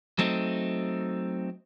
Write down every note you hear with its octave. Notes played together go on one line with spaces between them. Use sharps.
F#3 A3 C4 D#4